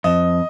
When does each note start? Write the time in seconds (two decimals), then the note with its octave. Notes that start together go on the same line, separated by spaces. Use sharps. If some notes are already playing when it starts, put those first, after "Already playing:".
0.04 F2 D#5